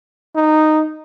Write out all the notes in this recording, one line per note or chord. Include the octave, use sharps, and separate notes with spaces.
D#4